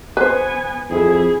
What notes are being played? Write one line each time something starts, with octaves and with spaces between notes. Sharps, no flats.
B3 B4 C5 G#5
F2 E4 G#4